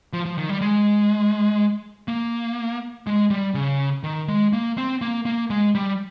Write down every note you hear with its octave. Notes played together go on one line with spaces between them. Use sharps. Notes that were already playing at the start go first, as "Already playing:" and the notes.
F3
F3
D#3
G3
G#3
A#3
G#3
G3
C#3
D#3
G#3
A#3
C4
A#3
A#3
G#3
G3